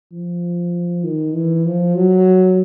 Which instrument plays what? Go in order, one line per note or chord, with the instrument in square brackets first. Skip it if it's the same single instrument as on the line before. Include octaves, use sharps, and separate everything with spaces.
[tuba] F3
D#3
E3
F3
F#3